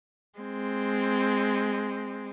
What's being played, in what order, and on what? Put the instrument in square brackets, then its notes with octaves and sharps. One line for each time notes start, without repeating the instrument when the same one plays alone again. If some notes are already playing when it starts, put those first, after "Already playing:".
[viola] G#3 C4